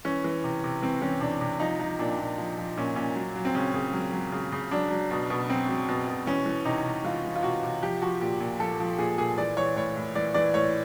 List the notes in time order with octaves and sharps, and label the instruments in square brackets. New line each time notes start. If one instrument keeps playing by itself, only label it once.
[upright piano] E3 C#4
E3
C3
C3
E3 C4
E3 C#4
C3 D4
C3
F3 D#4
F3 D#4
A#2 D4
A#2
F3
F3
A#2 C#4
A#2 C#4
F#3
F#3
C4
C#3 C#4
C#3
F#3
F#3
C#3
C#3
F#3 D4
F#3
B2
B2
F#3 C4
F#3
B2
B2
E3 C#4
E3
C3 D#4
C3
E3 F4
E3
F4
C3 F#4
C3
F3 G4
F3 F#4
A#2 G4
A#2
F3 A4
F3
A#2 G#4
A#2 G#4
E3 D5
E3 C#5
A2 C#5
A2
E3 D5
E3 D5
A2 C#5